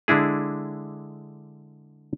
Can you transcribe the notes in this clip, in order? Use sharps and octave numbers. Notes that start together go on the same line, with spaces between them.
D3 G#3 D4 E4 G#4